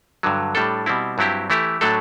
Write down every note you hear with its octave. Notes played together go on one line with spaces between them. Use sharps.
G2 D3 F#3
A2 G3 D4 A4
B2 G3 C4 E4
G2 F#3 C4 E4 G4
E3 A3 E4 G4
A2 F#3 A3 D4 A4